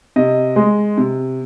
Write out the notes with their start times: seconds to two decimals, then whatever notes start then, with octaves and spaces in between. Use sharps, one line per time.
0.16 C3 D#5
0.56 G#3
0.98 C3